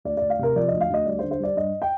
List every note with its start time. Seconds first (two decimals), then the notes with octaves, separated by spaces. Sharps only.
0.05 D2 D5
0.17 D2 D5
0.30 F5
0.39 C3 A#4
0.55 F3 D5
0.68 D2 D#5
0.81 F5
0.90 D2 D#5
1.06 G3 D5
1.19 C5
1.23 D3
1.31 C5
1.39 G3 D5
1.56 G2 D#5
1.82 G5